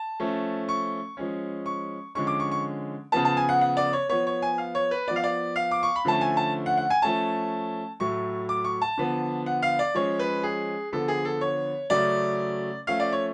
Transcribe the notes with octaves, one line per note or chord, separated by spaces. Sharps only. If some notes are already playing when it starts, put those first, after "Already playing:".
Already playing: A5
F3 A3 C#4
C#6
F3 G#3 C#4
C#6
D3 F3 G#3 C#4 C#6
D6
C#6
C#6
C#3 F3 B3 A5
A5
G#5
F#5
F#5
D5
C#5
F3 B3 C#5
C#5
G#5
F5
C#5
B4
F3 B3 D5
F5
D5
F5
D6
C#6
B5
D3 F3 A3 C#4 A5
G#5
A5
F#5
F#5
G#5
F3 A3 C#4 A5
A2 F#3 A3 C#6
D6
C#6
A5
D3 F3 B3
F#5
F5
D5
F3 G#3 C#4 C#5
B4
G#4
D3 F3 B3 A4
G#4
A4
C#5
C#3 F#3 A3 C#4 D5
F3 A3 C#4 F5
D5
C#5